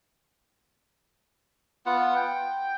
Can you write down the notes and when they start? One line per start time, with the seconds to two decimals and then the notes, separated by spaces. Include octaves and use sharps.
1.86 B3 F4 F#5
2.16 G5